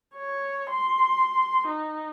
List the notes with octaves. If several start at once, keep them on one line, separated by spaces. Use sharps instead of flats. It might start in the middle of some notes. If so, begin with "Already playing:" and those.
C#5
C6
D#4